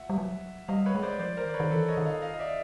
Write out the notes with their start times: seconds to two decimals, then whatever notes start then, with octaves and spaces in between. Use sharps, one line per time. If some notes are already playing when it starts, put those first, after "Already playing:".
Already playing: E5 F#5
0.10 G3
0.18 F#3
0.68 G3 D#5 F5
0.86 B4 C#5
0.95 G#3
1.02 C5 D5
1.19 F3 C5 D5
1.37 A#4 C5
1.45 D#3 D5
1.54 B4 C#5
1.60 D#3
1.71 E3 A4 B4
1.88 C#5 D#5
1.97 D#3
2.05 D#5 F5
2.22 D#5 F5
2.34 D#5
2.39 D5 E5